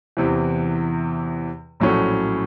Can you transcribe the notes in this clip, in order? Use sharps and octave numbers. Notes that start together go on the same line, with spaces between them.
E2 C3 E3
A#1 A2 F#3 A3 C#4